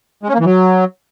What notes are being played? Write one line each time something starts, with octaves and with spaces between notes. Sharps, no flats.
G#3
C#4
A#3
E3
F#3